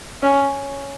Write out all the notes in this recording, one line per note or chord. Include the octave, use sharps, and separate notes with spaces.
C#4